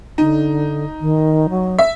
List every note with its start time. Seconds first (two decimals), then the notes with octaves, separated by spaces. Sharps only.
0.18 D3 D#4
1.01 D#3
1.49 F#3
1.79 E5